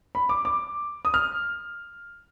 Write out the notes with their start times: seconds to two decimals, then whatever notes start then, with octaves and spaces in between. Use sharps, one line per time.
0.15 B5
0.29 D6
0.45 D6
1.05 D#6
1.14 F6